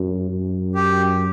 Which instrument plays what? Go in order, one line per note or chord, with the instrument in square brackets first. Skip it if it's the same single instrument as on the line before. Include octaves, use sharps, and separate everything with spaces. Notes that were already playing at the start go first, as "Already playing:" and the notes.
Already playing: [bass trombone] F#2
F#2
[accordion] G4